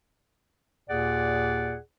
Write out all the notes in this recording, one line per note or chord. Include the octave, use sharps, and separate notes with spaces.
D#2 A#2 G#4 D5 F#5